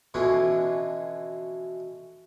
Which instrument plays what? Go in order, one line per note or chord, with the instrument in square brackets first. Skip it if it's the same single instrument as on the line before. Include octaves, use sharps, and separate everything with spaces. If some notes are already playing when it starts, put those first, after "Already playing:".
[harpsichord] B2 D3 E3 F3 C#4